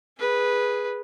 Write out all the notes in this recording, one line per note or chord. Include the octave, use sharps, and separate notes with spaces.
G#4 B4